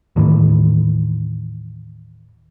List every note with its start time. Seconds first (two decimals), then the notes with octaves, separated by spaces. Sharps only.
0.16 D#2 A2 D#3 E3